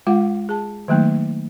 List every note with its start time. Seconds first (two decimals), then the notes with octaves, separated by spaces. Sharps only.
0.07 G#3 F4 F5 F#5
0.49 G#4 A5
0.88 D#3 F#3 A3 A#3 D#4